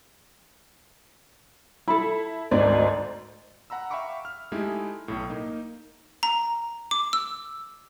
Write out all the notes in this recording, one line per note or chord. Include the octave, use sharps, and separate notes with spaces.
E4 A4 B5
G#1 D2 G#2 D5
F#5 A#5 B5 E6
E5 F5 G5 B5 C#6 D6
F6
G#3 A3 D#4 E4 G4 G#4
B1 A2
A#3 D#4
A#5
D6
E6